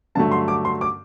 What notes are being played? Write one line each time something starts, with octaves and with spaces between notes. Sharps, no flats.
G2 D3 F#3 A3 A5
C6
D6
C6
D6